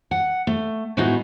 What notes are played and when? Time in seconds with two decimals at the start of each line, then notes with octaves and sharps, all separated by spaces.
0.11 F#5
0.47 A3
0.97 A2 G#3 B3 D#4 E4 F#4